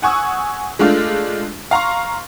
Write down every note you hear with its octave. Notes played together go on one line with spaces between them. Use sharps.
F#5 G#5 C#6 D#6 E6
G#3 A3 D4 F4
F5 A#5 C6 C#6